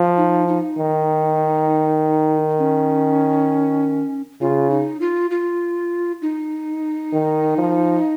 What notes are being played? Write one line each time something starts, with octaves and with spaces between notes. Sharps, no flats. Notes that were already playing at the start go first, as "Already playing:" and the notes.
Already playing: F3
D#4
D#4
D#3
C#4
C#3 F4
D#4
F4
F4
D#4
D#3
F3